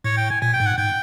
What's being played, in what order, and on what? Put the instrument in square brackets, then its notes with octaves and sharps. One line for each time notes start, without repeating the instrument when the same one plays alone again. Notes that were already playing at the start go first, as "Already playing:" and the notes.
[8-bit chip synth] A2 [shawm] C#5
[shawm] G5
G#5
[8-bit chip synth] A#2 [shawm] G#5
[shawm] G5
[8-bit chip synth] G#2
[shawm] F#5
[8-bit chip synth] G#2 [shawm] G5